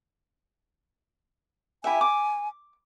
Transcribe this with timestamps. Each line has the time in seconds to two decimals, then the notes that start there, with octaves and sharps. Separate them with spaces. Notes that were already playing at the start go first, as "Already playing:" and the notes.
1.84 E4 G4 E5 G#5
2.01 D6